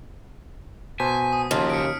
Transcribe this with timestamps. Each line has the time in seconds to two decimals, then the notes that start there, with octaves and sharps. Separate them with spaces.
1.00 B2 C5 G#5 A5 B6
1.32 D#6
1.51 D#2 C#3 F3 F#4 A5 C6 F6
1.70 C#7 D7